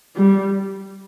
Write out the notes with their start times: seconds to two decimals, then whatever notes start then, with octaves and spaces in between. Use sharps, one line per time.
0.16 G3